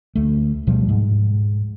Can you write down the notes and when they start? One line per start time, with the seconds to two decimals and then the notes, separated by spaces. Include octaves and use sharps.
0.15 D2 A3
0.67 D2 B2 F3 G3
0.89 G#2